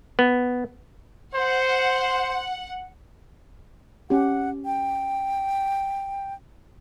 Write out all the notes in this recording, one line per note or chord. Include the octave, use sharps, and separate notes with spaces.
B3
C5 F#5
C#4 G4 F#5
G5